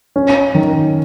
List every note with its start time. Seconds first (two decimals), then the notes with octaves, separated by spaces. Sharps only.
0.16 C#4
0.55 D#3